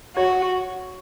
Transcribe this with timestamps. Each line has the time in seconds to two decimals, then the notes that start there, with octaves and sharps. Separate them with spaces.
0.16 F#4 C#5